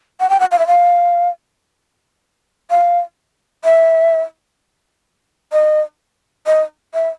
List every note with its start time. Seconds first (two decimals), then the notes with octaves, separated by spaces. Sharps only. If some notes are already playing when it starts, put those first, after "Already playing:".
0.20 F#5
0.29 G5
0.40 F#5
0.51 F5
0.59 E5
0.67 F5
2.70 F5
3.65 E5
5.52 D#5
6.46 D#5
6.94 E5